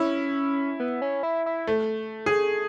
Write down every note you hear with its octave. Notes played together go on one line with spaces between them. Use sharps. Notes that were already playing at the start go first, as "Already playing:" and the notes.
Already playing: C#4 E4
B3
C#4
E4
E4
A3
G#4